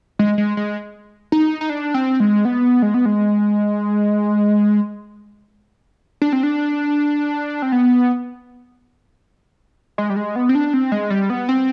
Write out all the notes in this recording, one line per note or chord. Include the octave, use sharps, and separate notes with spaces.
G#3
G#3
G#3
D#4
D#4
D4
C4
G#3
B3
G#3
B3
G#3
D4
C4
D4
C4
B3
G#3
G3
G#3
B3
C4
D4
C4
G#3
G3
B3
C4